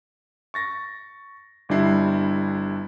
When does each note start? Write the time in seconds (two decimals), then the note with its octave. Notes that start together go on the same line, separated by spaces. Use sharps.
0.54 C#6 A6 A#6
1.69 G1 G3 D4 E4 C7